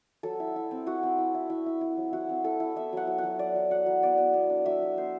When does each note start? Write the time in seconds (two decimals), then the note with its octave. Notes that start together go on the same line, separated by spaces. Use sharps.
0.23 F#3 A4
0.40 E4
0.56 E4
0.71 C4
0.86 E4 F#4
1.03 C4
1.19 E4
1.35 E4
1.50 E4
1.66 E4
1.81 E4
1.97 F#3
2.13 E4 F#4
2.29 C4
2.44 E4 A4
2.60 E4
2.76 B3 E5
2.93 F#3 F#5
3.07 F#3
3.18 F#5
3.24 F#3
3.39 F#3 D5
3.56 F#3
3.71 F#3 F#5
3.86 F#3
4.03 B3 D5
4.18 B3
4.34 B3
4.50 D4
4.66 F#3 E5
4.82 F#3
4.97 B3 C5